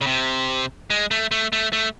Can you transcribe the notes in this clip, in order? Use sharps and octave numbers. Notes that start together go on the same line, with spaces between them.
C#3
C3
G#3
A3
A3
A3
A3